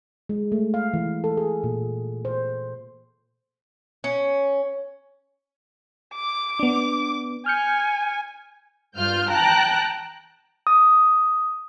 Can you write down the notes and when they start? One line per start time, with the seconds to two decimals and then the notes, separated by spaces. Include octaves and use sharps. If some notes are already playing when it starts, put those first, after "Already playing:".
0.29 G#3
0.52 A3
0.74 F5
0.94 E3
1.24 A4
1.37 G#4
1.64 A#2
2.25 C5
4.04 C#4
6.15 D6
6.59 B3 D4
7.46 G#5 F6 G6 C#7
8.97 G2 F4 F6 G6
9.30 G5 A5 A#5 F#6
10.67 D#6